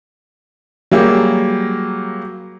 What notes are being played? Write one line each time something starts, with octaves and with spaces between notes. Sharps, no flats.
F#3 G3 A#3 G4 G#4